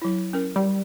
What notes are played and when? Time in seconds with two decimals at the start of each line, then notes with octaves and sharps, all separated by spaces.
0.02 F#3 E4
0.33 C#4 A#4
0.56 G3